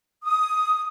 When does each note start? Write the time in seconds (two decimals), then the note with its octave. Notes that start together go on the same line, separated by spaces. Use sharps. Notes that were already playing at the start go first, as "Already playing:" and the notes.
0.23 D#6